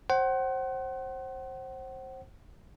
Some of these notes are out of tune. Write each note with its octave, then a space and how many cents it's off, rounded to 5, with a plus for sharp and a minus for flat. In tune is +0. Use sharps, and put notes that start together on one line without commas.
C5 +25 F#5 +35